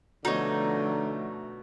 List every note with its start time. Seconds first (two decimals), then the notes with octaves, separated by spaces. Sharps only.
0.25 B2 D3 F3 A3 D#4 C#5